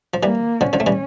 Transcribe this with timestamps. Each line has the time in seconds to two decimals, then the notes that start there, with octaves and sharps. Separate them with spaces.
0.14 F3
0.22 E3 G3 A#3
0.60 D3 F3 C#4
0.73 D3 F3
0.80 A3
0.86 E3 G3